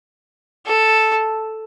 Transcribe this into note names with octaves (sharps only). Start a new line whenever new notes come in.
A4